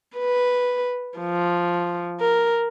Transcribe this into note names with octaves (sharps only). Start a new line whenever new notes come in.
B4
F3
A#4